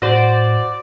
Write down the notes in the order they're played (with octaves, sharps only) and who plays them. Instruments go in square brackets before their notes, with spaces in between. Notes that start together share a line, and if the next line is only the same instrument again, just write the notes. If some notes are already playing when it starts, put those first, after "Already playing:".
[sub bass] A2 [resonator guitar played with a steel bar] F#4 C5 [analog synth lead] D5